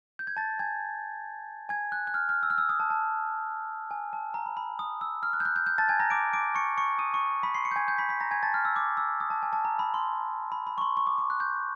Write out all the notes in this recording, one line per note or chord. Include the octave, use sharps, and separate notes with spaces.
G6
G#6
A5 A6
G#5 G#6
G#5 G#6
F#6
F#6
F6
F6
E6
F6
E6
D#6
A5
A5
G#5
A5
A#5
B5
B5
D#6
E6
F6
F#6
G6
F#6
G6
G6
A5 A6
G#5 G#6
A#5 A#6
D6 D7
D6 D7
C#6 C#7
C#6 C#7
D#6 D#7
C#6 C#7
B5 B6
C6 C7
C#6 C#7
G6
G#5 G#6
G6
B5 B6
B5 B6
A#5 A#6
G#5 G#6
A5 A6
F6
E6
D6
E6
D#6
A5
G#5
A5
A#5
B5
C6
B5
B5
C#6
C6
C#6
D6
D6
F#6
G6